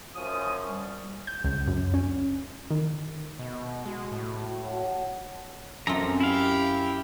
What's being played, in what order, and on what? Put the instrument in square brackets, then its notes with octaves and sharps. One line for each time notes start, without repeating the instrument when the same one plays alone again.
[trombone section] F#2 F3 C#4 [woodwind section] D#6
[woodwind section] G3
[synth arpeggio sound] G6
C#2
F#2
C#4
D#3
[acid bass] B2 [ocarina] D#5
[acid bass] G#3 [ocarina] F#4
[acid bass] A2
[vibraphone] C#5 F#5 A5
[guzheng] F#2 F4 [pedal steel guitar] C4 A4 A#5
[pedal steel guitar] E4 F5 [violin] G4 G5